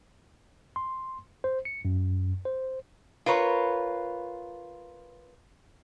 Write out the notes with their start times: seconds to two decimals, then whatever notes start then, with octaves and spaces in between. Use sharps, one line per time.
0.76 C6
1.44 C5
1.65 C#7
1.85 F#2
2.45 C5
3.26 F4 A#4 B4 C#5